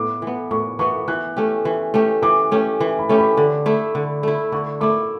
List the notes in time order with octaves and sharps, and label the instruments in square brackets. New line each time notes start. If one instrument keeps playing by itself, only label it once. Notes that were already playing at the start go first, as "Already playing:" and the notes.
Already playing: [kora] A2 B3 [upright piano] D6
[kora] E3 B3
[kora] A2 [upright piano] C#6
[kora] E3 B3 [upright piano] C#6
[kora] E3 [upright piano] F#6
[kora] A3 C#4 G4
E3
A3 C#4 G4
[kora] E3 [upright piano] D6
[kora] A3 C#4 G4
E3
[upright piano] B5
[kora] A3 C#4 G4
[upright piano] B5
[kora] D3
A3 E4
D3
A3 E4
[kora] D3 [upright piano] C#6
[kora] A3 E4 [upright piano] D6